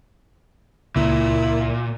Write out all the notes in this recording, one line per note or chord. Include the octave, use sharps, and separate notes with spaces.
C#2 A#2 E4